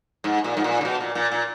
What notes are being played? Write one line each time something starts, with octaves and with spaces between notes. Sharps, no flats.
G#2
A#2
G#2
A#2
C#3
B2
A#2
A#2
A#2